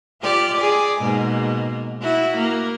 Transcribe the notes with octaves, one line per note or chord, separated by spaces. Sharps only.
F4 G4 D5
G#4 D5
G#2 B2 A#3
E4 F#4
A#3